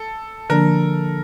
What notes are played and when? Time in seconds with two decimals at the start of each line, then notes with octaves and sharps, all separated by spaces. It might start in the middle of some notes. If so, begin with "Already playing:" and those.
Already playing: A4
0.50 D3 F3 A#3 D4 A#4